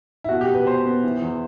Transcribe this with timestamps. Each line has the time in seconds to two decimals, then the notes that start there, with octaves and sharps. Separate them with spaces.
0.24 E4
0.29 B2 F#4
0.41 G4
0.48 B2
0.54 B4
0.66 B2 C5
0.85 B3
1.04 E3
1.22 E2